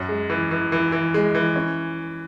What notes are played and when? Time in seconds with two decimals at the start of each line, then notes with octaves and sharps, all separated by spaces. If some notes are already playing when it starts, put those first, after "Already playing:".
Already playing: F#2
0.09 G#3
0.30 E3
0.51 E3
0.72 E3
0.92 E3
1.14 G#3
1.35 E3
1.56 C#4